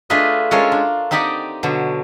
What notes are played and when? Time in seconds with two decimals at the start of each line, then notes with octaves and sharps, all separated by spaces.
0.10 A3 D4 F4 G#4 B4 D#5
0.51 G#3 C#4 F4 A4 A#4 C#5
0.72 D4
1.11 C4 D#4 G4 D5 D#5 F#5
1.63 B2 D3 F#3